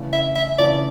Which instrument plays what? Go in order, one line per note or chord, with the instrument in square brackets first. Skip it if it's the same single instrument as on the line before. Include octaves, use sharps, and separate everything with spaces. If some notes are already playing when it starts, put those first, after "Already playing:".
Already playing: [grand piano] C#3 E3 A3 D4
[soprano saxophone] E5
E5
[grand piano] C#3 E3 A3 D4 [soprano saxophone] D5